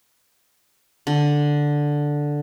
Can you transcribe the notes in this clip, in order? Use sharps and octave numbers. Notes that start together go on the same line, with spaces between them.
D3